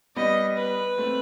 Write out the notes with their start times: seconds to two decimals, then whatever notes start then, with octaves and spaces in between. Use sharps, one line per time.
0.16 G3 B3 D#5
0.57 B4
0.98 A3 C4